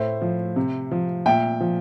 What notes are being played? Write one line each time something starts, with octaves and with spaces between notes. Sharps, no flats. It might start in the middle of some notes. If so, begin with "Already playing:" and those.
Already playing: A2 C5 E5
F3
C3
F3
A#2 E5 G5
F3